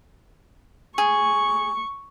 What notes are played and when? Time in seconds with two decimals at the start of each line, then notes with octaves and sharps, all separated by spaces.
0.98 G#4 C#6